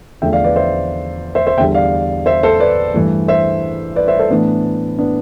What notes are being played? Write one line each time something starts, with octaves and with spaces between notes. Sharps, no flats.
E2 D3 F3 A3 E5 G5
D5 F5
B4 D5
C5 E5
C5 E5
C5 E5
E2 D3 G3 E5 G5
D5 F5
C5 E5
A4 C5
B4 D5
G2 E3 A3
C5 E5
B4 D5
C5 E5
A4 C5
A2 E3 A3 B3 D4
B3 D4